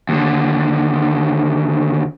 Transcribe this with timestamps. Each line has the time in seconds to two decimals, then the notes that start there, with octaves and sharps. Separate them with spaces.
0.09 D#2 D3